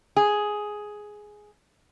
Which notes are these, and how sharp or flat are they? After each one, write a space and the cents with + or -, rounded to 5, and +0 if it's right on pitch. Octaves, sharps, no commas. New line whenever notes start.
G#4 +5